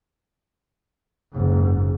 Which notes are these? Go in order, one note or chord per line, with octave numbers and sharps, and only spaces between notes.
F#1 G#2